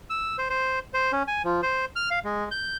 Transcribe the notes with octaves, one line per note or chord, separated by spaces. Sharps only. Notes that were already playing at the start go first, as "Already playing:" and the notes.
E6
C5
C5
C5
C#4
G#5
F3
C5
F6
F5
G#3
G6